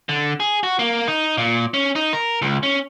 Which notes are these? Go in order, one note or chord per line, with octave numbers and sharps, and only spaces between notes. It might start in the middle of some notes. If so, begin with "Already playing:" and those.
D3
G#4
F#4
A#3
D#4
A#2
C#4
D#4
A#4
C#2
C#4